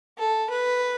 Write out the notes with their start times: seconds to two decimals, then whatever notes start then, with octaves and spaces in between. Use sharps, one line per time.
0.18 A4
0.50 B4